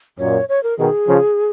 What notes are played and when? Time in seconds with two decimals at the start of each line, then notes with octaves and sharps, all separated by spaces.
0.19 F#2 A#2 C#5
0.49 C#5
0.63 A#4
0.78 B2 D#3 G#4
1.08 C#3 F3